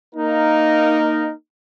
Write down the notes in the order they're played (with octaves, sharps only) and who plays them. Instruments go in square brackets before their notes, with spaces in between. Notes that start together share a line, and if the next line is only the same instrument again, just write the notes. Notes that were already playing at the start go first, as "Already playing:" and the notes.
[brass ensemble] A#3 D#4 A#4